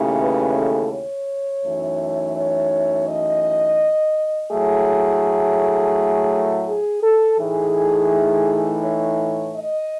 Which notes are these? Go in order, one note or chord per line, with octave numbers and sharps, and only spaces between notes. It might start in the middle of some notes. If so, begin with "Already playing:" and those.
Already playing: D#2 C#3 E3 A3 C#4
B4
A4
C#5
F#2 E3 A3 D#4
C#5
D#5
A2 F#3 A3 G#4
G#4
A4
A2 E3 A3 D#4 G#4
C#5
D#5